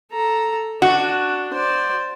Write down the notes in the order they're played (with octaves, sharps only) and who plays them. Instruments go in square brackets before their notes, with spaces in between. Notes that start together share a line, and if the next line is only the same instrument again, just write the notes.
[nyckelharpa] A4 A#5
[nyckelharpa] D4 [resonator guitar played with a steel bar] F#4
[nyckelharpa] C5 D5